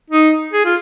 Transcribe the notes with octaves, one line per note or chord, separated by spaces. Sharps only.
D#4
G#4
F4